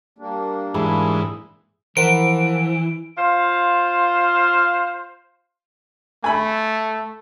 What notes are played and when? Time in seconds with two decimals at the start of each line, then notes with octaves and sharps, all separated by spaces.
0.18 G3 A#3 D4
0.74 G#2 E3 G#4 B5
1.97 E3 F3 A#4 C5 F#5 D7
3.18 F4 C5 F5
6.24 A3 G#5 B5